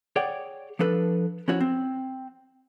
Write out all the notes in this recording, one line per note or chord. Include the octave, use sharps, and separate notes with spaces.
G#4 C#5 D5 F#5 G5
F3 D4 A4 B4
F3 C#4 E4 F#4 C#5
C4